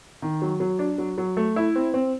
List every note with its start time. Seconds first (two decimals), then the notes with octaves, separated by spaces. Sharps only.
0.22 D#3
0.42 F#3
0.60 F#3
0.79 D4
0.98 F#3
1.18 F#3
1.37 A3
1.56 E4
1.76 C4
1.94 C4